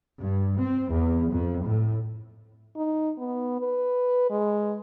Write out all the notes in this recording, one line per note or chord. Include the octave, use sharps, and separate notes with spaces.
G2
C4
E2
F2
A2
D#4
B3
B4
G#3